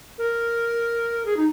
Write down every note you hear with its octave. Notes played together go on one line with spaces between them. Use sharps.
A#4
G#4
D#4